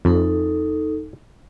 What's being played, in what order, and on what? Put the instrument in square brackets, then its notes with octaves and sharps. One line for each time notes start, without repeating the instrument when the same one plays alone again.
[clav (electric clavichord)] F2 [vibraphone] D#4 A4